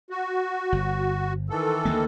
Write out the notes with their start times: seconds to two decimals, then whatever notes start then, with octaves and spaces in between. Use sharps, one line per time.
0.10 F#4
0.72 G1
1.50 D#3 E3 A4
1.85 D2 G#3 A#3